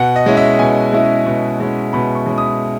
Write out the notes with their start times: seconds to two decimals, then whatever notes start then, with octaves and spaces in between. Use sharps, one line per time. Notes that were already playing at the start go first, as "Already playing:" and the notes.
Already playing: B2 F#5
0.16 D#5
0.26 G#3 C#4 E4
0.37 E5
0.59 B2 G#5
0.93 G#3 C#4 E4
1.26 B2
1.60 G#3 C#4 E4
1.93 B2 B5
2.15 C#6
2.26 G#3 C#4 E4
2.38 D#6